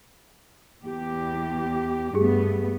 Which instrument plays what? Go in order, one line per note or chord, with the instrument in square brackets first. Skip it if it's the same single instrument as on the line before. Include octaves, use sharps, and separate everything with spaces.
[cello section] E2 G4
[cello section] G2 A3 B3 [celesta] G4 G#4